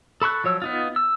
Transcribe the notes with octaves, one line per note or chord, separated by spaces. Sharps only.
A4 B5 C#6 F#6
F3 F#3 C#5 E6
B3 D#4 F4
E6